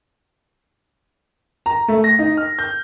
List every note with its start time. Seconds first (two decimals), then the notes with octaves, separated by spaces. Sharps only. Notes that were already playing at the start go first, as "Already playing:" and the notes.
1.66 A#5
1.88 A3
2.04 A#6
2.19 D#4
2.37 F6
2.59 G6